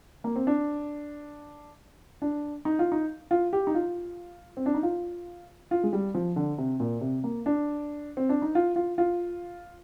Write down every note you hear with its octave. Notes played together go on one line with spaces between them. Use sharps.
A#3
C4
D4
D4
D#4
F4
D#4
F4
G4
D#4
F4
C4
D4
D#4
F4
F4
G#3
G3
F3
D3
C3
A#2
C3
A#3
D4
C4
D4
D#4
F4
F4
F4